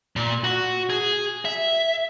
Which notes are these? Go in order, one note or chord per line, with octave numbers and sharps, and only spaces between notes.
A#2
F#4
G#4
E5